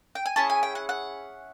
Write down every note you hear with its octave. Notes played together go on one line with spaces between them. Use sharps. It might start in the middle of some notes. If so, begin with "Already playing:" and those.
G5
G#5
C#4 E4 G#4 A5
G#5
G5
F#5
F#5